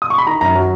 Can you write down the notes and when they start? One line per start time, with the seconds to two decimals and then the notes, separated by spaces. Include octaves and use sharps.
0.02 D#6
0.10 C#6
0.18 B5
0.27 D#3 A#5
0.41 F#2 A#5
0.55 F#3